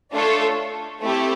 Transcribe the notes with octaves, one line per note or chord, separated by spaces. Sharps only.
A3 D4 F4 A4 C#5
A3 C4 E4 G4